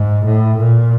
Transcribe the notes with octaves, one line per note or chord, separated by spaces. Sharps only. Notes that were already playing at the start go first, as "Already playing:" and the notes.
Already playing: G#2
A2
A#2